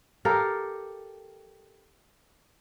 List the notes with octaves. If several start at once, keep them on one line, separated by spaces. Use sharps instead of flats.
G4 A4 A#4 F5